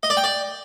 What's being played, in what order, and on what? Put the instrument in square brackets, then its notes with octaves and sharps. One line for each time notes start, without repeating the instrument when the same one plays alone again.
[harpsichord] D#5
D5
G5
D5